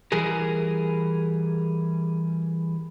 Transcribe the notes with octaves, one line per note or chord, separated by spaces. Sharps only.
E3 G3 G#4 A#4